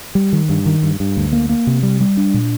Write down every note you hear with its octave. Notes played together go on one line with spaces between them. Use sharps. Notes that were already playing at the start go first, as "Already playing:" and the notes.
G3
D#3
G2
D#3
G2
G2
D2
A#3
A#3
C3
G3
G3
D4
A#2